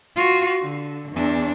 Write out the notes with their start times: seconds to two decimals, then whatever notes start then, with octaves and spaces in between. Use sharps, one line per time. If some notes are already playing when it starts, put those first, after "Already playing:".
0.16 F4 F#4
0.63 D3
1.12 E2 D4